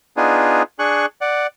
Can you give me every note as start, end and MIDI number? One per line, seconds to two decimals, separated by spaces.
0.17 0.63 59
0.17 0.63 62
0.17 0.63 63
0.17 0.63 65
0.17 0.63 68
0.79 1.06 62
0.79 1.06 68
0.79 1.06 85
0.79 1.06 90
1.21 1.47 74
1.21 1.47 78